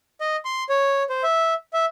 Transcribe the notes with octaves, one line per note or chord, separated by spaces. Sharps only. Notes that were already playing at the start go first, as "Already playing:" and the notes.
D#5
C6
C#5
C5
E5
E5